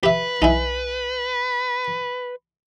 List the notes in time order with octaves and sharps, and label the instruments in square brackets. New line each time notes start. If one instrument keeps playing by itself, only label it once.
[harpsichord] G4 E5 [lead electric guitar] B4
[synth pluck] B1 G#5 [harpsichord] D#4 E4